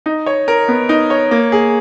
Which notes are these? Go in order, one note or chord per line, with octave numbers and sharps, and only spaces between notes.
D#4
C#5
A#4
B3
D#4
C#5
A#3
G#4